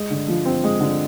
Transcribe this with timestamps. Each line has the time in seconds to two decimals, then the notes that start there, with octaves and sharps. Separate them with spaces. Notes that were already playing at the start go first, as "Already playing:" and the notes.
Already playing: G#3
0.10 D3
0.28 F3
0.45 C4
0.64 G#3
0.80 D3